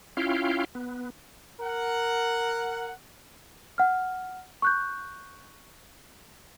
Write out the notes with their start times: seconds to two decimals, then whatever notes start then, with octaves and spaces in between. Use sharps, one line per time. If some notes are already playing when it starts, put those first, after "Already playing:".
0.17 C#4 E4 F4 F5 G5
0.75 B3
1.61 A#4 F#5
3.78 F#5 F6
4.62 C#6 F#6 G6